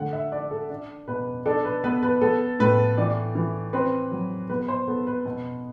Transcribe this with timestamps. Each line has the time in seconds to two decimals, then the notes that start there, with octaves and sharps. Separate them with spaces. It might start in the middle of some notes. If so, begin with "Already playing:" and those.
Already playing: D3 A3 F#5
0.13 E5
0.32 D4 D5
0.51 A4
0.70 D4
1.08 B2 B4
1.46 D4 A4
1.65 B4
1.84 B3 B4
2.03 B4
2.21 B3 A4
2.60 A2 B4
2.98 E3 D5
3.35 E3
3.73 C4 B4
4.12 F#3
4.49 B3 B4
4.59 B4
4.68 C5
4.87 B3 A4
5.07 B4
5.25 B2